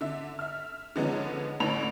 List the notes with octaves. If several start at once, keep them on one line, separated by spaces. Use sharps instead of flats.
D3 E5
E5 F6
D3 F3 G#3 B3 C#4 D#4
A1 A2 D3 B3 B5 F7